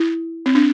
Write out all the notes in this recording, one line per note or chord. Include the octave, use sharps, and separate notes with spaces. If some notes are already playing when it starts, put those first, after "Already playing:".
Already playing: E4
C4
D4